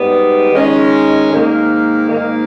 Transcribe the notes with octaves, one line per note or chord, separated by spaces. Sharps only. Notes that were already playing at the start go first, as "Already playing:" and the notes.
Already playing: G#2 G3 B3
D#3 G#3 C#4
G#2 D#3 A#3
G#2 D#3 A#3